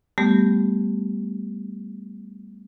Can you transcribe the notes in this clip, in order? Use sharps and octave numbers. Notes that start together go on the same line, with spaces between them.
G3 A3 B3 G4